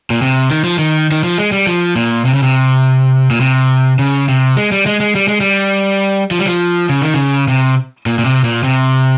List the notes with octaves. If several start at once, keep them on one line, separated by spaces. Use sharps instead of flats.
A#2
C3
D#3
F3
D#3
D#3
F3
G#3
G3
F3
A#2
C3
C#3
C3
A#2
C3
C#3
C3
G#3
G3
G#3
G#3
G3
G#3
G3
F3
G3
F3
C#3
D#3
C#3
C3
A#2
A#2
C3
A#2
C3